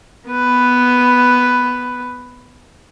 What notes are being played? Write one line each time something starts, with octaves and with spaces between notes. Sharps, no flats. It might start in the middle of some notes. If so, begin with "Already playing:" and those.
B3 B4